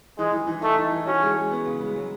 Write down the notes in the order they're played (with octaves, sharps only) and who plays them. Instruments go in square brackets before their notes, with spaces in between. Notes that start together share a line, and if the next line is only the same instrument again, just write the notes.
[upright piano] E3 [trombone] G#3
[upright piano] E3
E3
[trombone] A3 [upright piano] D#4
[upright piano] D#4
E3
[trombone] C#4 [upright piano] F#4
[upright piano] G#3
G#3
B3
C#3
G#3
F#3